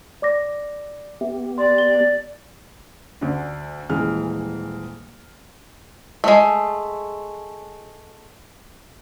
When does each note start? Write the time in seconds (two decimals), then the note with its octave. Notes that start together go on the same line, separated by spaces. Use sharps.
0.22 D5 D6 A#6
1.21 B3 G4 E5
1.58 D5 C6
1.78 G7
3.21 D2 D3
3.90 D#1 E3 G#3 F6
6.24 G#3 A3